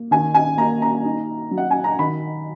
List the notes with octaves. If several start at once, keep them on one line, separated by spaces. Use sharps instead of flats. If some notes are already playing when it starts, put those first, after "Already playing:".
Already playing: A#3
D#3 G#5
G#5
A#3 A#5
A#5
D#4
F#3
F#5
G#5
A#5
D#3 B5